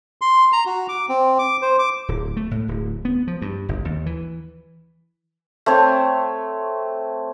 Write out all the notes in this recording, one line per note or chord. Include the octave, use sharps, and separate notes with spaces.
C6
A#5
F#4
D6
C4
D6
C5
D6
D1
A3
A2
D1
B3
F3
G2
G1
D#2
E3
A3 C4 C#5